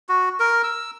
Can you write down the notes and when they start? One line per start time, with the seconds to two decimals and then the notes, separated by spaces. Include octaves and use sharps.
0.09 F#4
0.40 A#4
0.63 E6